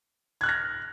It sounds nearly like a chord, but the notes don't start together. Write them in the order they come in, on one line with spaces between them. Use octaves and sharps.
G#6 F#6 F6 A#6